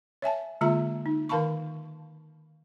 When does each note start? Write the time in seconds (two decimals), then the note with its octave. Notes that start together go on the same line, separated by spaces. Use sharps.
0.22 C#5 E5 G#5 A5
0.61 D3 G#3 A#3 F4 E5 A#5
1.06 D#4
1.29 D#3 A#4 F5 A5 B5 C#6